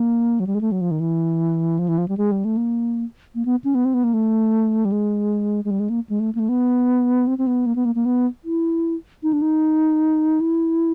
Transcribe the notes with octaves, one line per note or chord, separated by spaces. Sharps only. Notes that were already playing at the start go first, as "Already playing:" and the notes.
Already playing: A#3
F#3
G3
G#3
A3
F#3
F3
D#3
E3
F3
E3
F3
G3
G#3
G3
A3
A#3
A#3
B3
C#4
B3
C4
B3
A#3
A3
G3
G#3
G#3
G3
G#3
A#3
G#3
A3
A#3
A3
B3
C4
C4
B3
A#3
B3
A#3
A#3
B3
E4
D#4
D4
D#4
E4